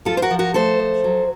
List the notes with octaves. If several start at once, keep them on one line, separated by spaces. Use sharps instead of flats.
F3 F4 A4
C5
F#4 A#4
F3
F#4 A#4
A3 A4 C5
F3
F#3